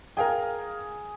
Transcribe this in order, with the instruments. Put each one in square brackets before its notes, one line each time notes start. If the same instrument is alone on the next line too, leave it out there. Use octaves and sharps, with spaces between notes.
[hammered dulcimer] G#4 [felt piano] A#4 F5 G5